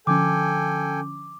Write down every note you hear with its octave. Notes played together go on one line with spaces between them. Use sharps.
D3 F3 C#4 A4 G5 G#5 D6